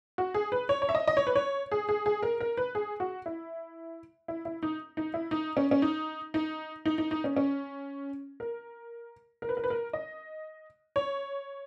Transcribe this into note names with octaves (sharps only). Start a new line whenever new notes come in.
F#4
G#4
B4
C#5
C#5
E5
D#5
D#5
C#5
B4
C#5
G#4
G#4
G#4
A#4
A#4
B4
G#4
F#4
E4
E4
E4
D#4
D#4
E4
D#4
C#4
C#4
D#4
D#4
D#4
D#4
D#4
C#4
C#4
A#4
A#4
B4
A#4
B4
A#4
D#5
C#5